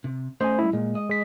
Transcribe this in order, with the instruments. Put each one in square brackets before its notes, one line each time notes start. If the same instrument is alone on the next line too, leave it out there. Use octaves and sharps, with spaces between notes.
[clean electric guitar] C3
[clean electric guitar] A3 C#4 D#5 [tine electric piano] C5 G#5
[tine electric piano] G3 E4
[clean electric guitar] A#2 [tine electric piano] G#3
[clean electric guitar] D#5
[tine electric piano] G#3 D#6 B6